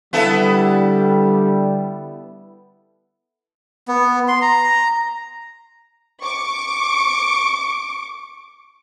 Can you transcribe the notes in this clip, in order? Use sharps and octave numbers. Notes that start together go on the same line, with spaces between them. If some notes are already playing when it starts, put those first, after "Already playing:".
D3 G3 B3 E4 A4
B3
C6
A#5
C#6 D6